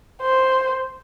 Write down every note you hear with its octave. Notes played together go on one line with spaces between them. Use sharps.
C5